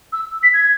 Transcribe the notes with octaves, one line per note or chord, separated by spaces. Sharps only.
E6
B6
G#6